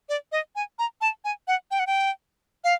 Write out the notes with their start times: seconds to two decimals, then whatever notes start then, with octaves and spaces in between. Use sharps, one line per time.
0.09 D5
0.32 D#5
0.56 G#5
0.79 A#5
1.01 A5
1.25 G#5
1.48 F#5
1.71 G5
1.79 F#5
1.87 G5
2.64 F5